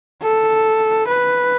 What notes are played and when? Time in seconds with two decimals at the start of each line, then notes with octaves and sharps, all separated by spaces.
0.23 A4
1.08 B4